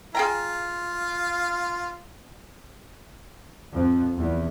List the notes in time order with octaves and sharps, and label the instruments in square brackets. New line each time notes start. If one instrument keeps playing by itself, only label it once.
[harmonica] F4 [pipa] G#4 G5 A#5
[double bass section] F2
E2